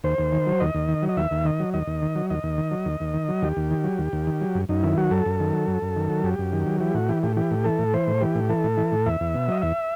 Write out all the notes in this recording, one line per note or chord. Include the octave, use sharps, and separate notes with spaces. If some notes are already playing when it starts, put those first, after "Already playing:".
D#2 C5
D#2
D#3
F#3
D#2 D#5
D#2
D#3
F#3
D#5
D#2 E5
D#2
D#3 D#5
F#3
D#2 D#5
D#2
D#3
F#3
D#2 D#5
D#2
D#3
F#3
D#2
D#2
D#3
F#3
D#2 G4
D#2
D#3
F#3
D#2
D#2
D#3
F#3
F#2
F#2 D#4
D#3 E4
F#3 F#4
F#2 A4
F#2
D#3
F#3
F#2
F#2
D#3
F#3
F#2 G4
F#2
D#3
F#3
E3 G4
A2 F#4
E3 G4
A2 G4
E3 G4
A2
E3 A4
A2
E3 C5
A2
E3 G4
A2
E3 A4
A2
E3
A2
E2 E5
E2
B2
F#3 D#5
E2 E5